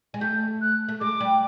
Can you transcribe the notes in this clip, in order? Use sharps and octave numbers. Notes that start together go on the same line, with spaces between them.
G#3
A3 G6
F#6
A3
G#3 D6
G3